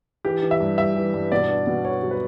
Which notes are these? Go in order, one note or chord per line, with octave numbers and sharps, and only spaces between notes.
E3 G4
E3
E5
G2
G2 E5
E3
G2
B2 D5
D4
B2
B3 C#5
F#3
B4